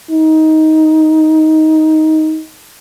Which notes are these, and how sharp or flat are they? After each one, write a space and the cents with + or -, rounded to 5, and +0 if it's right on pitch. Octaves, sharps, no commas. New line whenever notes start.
D#4 +15